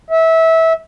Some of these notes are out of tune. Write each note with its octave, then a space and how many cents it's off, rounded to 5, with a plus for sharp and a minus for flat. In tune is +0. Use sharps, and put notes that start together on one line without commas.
E5 -20